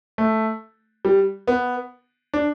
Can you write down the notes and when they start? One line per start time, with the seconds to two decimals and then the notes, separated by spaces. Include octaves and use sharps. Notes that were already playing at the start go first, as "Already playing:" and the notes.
0.18 A3
1.05 G3
1.47 B3
2.34 D4